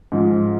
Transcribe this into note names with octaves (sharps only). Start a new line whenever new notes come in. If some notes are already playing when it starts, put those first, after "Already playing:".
G#2 F3 G#3